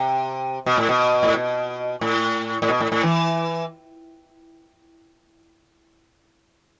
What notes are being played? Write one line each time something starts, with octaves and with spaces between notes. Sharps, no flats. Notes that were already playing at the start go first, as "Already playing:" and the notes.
Already playing: C3
B2
A2
B2
A2
B2
A2
A2
B2
A2
A2
E3